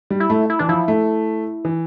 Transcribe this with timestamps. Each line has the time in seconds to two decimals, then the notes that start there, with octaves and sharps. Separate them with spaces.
0.10 G3
0.20 E4
0.30 A3
0.50 E4
0.59 E3 D4
0.69 F3 E4
0.88 A3
1.65 E3